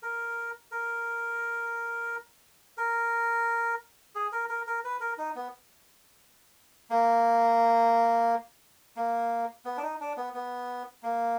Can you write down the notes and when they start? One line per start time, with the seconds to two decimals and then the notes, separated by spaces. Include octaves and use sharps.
0.02 A#4
0.71 A#4
2.77 A#4
4.15 G#4
4.32 A#4
4.49 A#4
4.67 A#4
4.84 B4
5.00 A#4
5.18 D#4
5.35 B3
6.90 A#3
8.97 A#3
9.65 B3
9.77 D4
9.82 D#4
10.00 D4
10.17 B3
10.34 B3
11.03 A#3